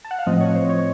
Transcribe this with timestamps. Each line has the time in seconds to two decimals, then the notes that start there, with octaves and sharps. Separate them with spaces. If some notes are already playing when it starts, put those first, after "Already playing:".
0.05 A5
0.11 F#5
0.19 F5
0.26 A2 F3 C4 D#5
0.41 C#5
0.55 C5
0.69 C#5